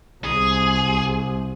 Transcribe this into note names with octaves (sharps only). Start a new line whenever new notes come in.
C2 G#4